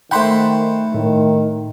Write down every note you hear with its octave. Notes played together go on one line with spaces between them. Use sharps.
D#3 A3 C5 F#5 G5 B5 C6
A2 D#3